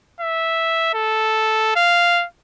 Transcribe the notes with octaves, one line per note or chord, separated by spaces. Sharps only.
E5
A4
F5